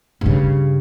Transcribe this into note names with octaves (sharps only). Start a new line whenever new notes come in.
G2 C#3